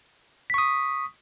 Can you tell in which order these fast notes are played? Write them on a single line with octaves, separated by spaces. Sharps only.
B6 C#6 D#6